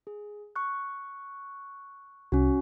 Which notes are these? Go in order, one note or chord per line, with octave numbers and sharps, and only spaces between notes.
G#4
C#6 F#6
C2 C#4 F#4